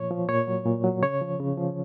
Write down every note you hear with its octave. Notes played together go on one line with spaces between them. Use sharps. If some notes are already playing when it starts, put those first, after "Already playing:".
Already playing: A#2 F3 C#5
F3
A#2 C#5
F#3
A#2
F#3
C#3 C#5
F3
C#3
F3